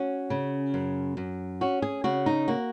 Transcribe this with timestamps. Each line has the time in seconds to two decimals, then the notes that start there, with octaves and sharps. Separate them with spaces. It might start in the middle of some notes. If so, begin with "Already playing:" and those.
Already playing: C#4 F#4
0.30 C#3
0.74 F#2
1.17 F#2
1.61 C#4 F#4
1.82 G#4
2.04 C#3 F#4
2.26 D#4
2.48 A#3 F#4